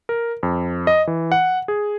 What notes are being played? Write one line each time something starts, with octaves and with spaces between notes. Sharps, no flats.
A#4
F2
D#5
E3
F#5
G#4